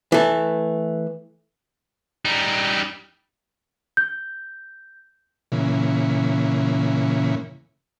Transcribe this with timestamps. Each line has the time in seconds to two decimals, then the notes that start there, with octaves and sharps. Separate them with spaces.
0.12 E3 A3
2.25 G3 D#4
3.97 G6
5.52 A#2 C#3 E3